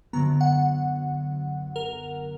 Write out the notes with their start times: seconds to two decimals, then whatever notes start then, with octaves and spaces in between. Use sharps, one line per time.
0.13 F#2 D3 F#3 B3 A#5
0.41 F#5
1.76 A#4